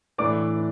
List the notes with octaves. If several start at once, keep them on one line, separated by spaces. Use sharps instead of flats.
A2 E3 A3 D4 D5 D6
D4